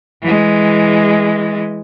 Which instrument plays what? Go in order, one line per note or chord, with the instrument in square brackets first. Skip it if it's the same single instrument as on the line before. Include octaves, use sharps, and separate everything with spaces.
[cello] E3 G#3